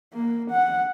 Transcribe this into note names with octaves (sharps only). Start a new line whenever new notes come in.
A#3
F#5